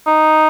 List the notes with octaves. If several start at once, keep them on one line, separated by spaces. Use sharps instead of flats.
D#4